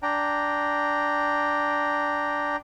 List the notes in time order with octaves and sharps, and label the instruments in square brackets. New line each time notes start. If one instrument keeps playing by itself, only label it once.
[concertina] D4 G5 A#5